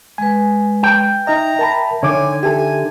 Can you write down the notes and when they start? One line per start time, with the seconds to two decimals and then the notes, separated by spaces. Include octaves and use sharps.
0.18 G#3 B4 G#5
0.83 G5
1.27 D#4 D#5 E5 A#5
1.59 A#4 A5 B5
2.03 D3 D#3 C#5 G#5 D6
2.43 G4 A4 E5 G#5